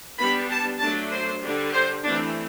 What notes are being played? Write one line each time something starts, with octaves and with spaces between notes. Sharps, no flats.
G3 B3 D4 B5
A5
F#3 A3 D4 A5
C5
D3 G3 D4
C5
E3 A3 C4 D4